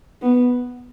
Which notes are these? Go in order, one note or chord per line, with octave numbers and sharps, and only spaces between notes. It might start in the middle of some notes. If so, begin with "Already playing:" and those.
B3